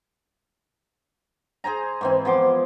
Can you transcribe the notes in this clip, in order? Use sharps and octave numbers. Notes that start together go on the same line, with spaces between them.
G#4 C5 G#5 A#5
G#2 E3 C4
F3 B3 C6 D6